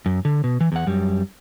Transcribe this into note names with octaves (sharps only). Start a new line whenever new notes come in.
F#2
D3
B2
E3
E2 F#5
F#2 G3